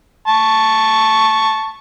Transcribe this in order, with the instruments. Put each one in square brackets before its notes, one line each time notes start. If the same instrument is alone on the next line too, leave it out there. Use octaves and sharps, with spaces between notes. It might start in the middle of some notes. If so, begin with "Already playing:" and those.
[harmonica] A5 C#6